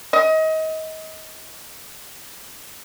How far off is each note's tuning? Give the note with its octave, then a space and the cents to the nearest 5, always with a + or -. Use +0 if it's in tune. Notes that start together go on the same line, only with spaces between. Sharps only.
D#5 +30